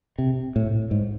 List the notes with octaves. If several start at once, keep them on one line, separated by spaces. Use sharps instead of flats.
C3
A2
G#2